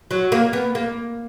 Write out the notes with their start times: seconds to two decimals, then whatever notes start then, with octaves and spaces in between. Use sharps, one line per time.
0.11 F#3
0.32 A#3
0.53 B3
0.75 A#3